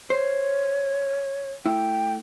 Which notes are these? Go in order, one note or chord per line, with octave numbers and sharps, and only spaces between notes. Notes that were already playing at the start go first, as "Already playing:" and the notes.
C5 C#5
A3 E4 G5